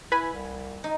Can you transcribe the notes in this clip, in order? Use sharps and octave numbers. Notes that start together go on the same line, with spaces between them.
E4 B4 G#5 B5
C2
D#4